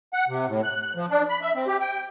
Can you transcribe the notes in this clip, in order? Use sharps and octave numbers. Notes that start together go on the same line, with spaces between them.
F#5
C3
A2
F#6
F#6
F3
D4
B5
E5
C4
G4
G5